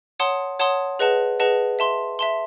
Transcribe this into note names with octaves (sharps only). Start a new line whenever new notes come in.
C#5 F#5 A5 C6 D#6
C#5 F#5 A5 C6 D#6
G#4 B4 D#5 F#5 A5
G#4 B4 D#5 F#5 A5
E5 A5 C6
E5 A5 C6